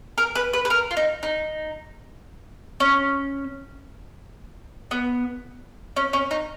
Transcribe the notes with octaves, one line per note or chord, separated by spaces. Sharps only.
A#4
B4
B4
B4
A#4
F4
D#4
D#4
C#4
B3
C#4
C#4
D#4